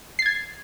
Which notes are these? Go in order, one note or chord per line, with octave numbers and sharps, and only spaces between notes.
G#6 A6 C7